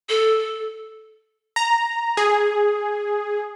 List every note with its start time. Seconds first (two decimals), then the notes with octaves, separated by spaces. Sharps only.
0.09 A4
1.56 A#5
2.17 G#4